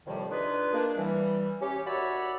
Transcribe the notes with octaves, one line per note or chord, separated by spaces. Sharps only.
F2 A2 C3 D#3 F3 G3
D4 D#4 F4 G#4 B4
A#3 D4
E3 G3
C#4 G4
D#2 F#4 C#5 D5 E5 B5